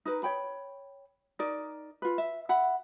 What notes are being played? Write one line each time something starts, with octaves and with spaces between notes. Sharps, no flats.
D#4 A#4 B4
C#5 G5 B5
D#4 A#4 D5
F4 B4
E5
E5 F#5 B5